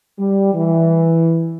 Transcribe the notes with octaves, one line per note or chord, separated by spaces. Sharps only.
G3
E3